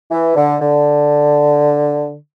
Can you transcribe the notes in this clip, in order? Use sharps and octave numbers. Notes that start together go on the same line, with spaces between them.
E3
D3
D3